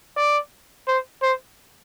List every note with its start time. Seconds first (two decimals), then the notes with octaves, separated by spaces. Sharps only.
0.17 D5
0.87 C5
1.22 C5